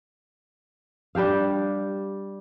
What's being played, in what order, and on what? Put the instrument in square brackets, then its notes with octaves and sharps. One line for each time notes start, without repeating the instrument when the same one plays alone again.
[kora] G3 D4 G4 F5